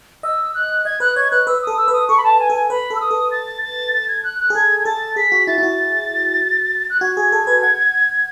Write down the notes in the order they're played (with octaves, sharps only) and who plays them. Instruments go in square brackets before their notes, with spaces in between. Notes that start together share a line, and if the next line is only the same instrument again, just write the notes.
[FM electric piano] D#5 [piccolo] E6
[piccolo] F#6
[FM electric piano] D#5 [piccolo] G#6
[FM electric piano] B4 [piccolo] F#6
[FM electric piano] C#5 [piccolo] G#6
[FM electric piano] B4 [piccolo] F#6
[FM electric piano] B4 [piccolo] E6
[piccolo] D#6
[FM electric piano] A4
[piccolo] E6
[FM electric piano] B4
[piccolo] D#6
[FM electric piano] A4 [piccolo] C#6
[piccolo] B5
A5
G#5
[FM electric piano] A4
[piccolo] G#5
[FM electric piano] B4 [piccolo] B5
[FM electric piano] A4 [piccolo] E6
[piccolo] D#6
[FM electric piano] A4
[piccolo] A6
A6
A6
G#6
F#6
F#6
[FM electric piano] G#4
[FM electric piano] A4 [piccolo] G#6
[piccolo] G#6
[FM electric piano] A4 [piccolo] A6
[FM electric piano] G#4 [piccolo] B6
[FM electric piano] F#4
[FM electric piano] E4 [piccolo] A6
[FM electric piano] E4
F#4
[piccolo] F#6
[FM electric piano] F#4 [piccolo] G#6
[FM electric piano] G#4
A4
B4
F#5